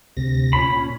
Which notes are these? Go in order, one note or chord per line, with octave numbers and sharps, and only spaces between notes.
D2 C3 A#6
A#2 C#4 B5